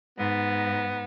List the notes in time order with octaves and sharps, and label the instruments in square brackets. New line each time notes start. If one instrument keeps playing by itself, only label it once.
[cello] G#2 [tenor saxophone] B3